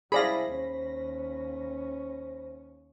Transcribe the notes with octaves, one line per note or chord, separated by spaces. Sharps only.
G3 E4 G#4 C5 D5 F5 B5 A#6
D#2 C#4